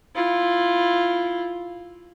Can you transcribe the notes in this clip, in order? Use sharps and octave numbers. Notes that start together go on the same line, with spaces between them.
E4 F4